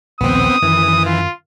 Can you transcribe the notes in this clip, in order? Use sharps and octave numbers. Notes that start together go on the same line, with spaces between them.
A#1 D#2 B2 B3 C4 D#6
F#2 D#3 E3
F4